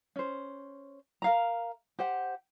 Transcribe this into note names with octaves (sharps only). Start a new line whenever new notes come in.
C#4 C5
A#4 F5 A#5
G4 C5 F#5